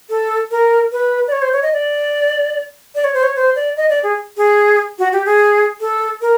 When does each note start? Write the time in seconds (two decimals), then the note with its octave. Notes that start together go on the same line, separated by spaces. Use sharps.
0.10 A4
0.51 A#4
0.92 B4
1.28 D5
1.32 C#5
1.42 C5
1.53 C#5
1.63 D#5
1.73 D5
2.95 D5
3.04 C#5
3.14 C5
3.23 C#5
3.36 C5
3.56 D5
3.77 D#5
3.90 D5
4.03 G#4
4.37 G#4
4.99 F#4
5.12 G4
5.26 G#4
5.80 A4
6.21 A#4